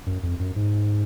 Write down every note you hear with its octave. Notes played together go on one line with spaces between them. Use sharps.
F#2
F2
F#2
G#2